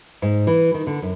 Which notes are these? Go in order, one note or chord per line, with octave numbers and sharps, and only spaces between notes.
G#2
E3
D#3
D3
F#2